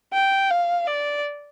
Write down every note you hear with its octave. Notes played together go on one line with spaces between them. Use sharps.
G5
F5
D5